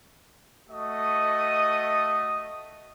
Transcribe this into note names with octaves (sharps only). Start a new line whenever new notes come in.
A3 F#4 D#5 D#6